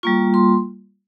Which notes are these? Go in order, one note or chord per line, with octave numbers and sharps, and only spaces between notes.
G3 A#3 F4 C#6
C6